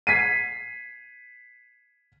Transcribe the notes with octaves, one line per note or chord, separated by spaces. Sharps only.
G#6 B6 C7 D#7